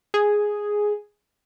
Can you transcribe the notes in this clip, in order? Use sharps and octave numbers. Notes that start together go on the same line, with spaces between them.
G#4